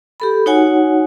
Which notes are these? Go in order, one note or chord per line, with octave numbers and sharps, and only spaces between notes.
G4 A4 B5
D#4 F#4 C#5 F#5 G#5